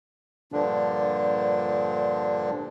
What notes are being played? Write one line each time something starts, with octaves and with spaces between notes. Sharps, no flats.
G2 A#2 D3 F3 D4